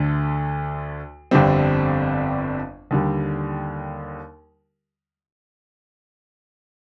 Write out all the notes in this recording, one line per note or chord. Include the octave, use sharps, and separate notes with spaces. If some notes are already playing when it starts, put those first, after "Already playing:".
Already playing: D2 D3 A3
G1 F2 D3 G3 C4
D#2 D3 G3